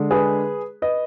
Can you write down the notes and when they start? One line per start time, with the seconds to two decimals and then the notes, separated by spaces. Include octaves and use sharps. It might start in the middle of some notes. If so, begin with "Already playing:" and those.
Already playing: D3 G#3
0.11 G#4 B4
0.82 B4 D#5